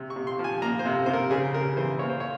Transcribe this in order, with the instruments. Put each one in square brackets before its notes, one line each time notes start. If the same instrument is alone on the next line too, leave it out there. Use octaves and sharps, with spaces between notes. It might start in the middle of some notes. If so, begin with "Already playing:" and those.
Already playing: [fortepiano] C3
C#6
C3
C6
F3
G#5
A#3 A#5
C5
C3
C3 C5
A#4
C#3 G#4
C#3 A#4
E3 C5
A#3 C#5
C5
C#5